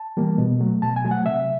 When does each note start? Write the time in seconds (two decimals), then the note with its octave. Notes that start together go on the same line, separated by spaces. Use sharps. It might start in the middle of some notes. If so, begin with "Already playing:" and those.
Already playing: A5
0.17 E3 G3 A#3
0.38 B2
0.60 F#3 A3
0.82 B2 A5
0.96 G#5
1.04 F#3 A3
1.11 F#5
1.26 C3 E5